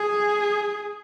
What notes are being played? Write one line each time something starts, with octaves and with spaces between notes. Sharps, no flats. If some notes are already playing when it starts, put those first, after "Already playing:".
Already playing: G#4